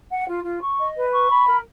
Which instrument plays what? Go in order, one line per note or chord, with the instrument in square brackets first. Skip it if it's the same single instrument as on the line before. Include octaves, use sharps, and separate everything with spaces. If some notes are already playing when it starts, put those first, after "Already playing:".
[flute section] F#5
F4
F4
C#6
D#5
B4
C#6
B5
A#4